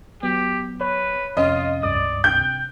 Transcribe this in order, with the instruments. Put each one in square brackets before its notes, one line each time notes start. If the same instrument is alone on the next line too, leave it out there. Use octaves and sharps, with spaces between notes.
[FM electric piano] F#3 B3 [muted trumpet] G4
[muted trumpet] B4 [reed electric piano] C#5
[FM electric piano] F2 C3 C#4 [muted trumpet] F4 [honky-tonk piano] D#5
[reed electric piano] C#2 G2 D#6 [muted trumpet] D5
[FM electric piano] C3 F#6 [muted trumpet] G5 [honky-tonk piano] G6